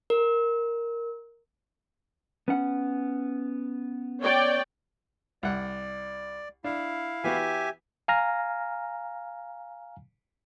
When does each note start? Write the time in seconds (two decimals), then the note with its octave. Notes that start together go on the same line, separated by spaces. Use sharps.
0.10 A#4
2.48 B3 C#4 F#5
4.21 C#5 D5 G5
5.43 C2 D5 F#5
6.64 D4 E4 F5
7.24 E3 B3 F#4 G4 E5 G#5
8.08 F5 G#5 A#5 F6 A#6